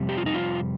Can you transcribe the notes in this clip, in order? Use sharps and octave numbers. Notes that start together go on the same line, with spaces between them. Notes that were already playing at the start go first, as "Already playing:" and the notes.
Already playing: F2 C3 G3
G4
F4
D#4
F4